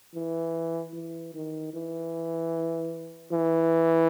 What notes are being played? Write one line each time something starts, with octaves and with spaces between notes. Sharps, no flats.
E3
E3
D#3
E3
E3